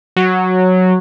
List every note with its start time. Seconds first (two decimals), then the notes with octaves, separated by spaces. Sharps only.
0.16 F#3